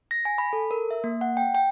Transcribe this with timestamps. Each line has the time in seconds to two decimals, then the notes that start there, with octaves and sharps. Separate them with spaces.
0.11 A#6
0.25 G#5
0.38 B5
0.53 A4
0.71 A#4
0.91 E5
1.04 A#3
1.21 F#5
1.37 G5
1.55 G5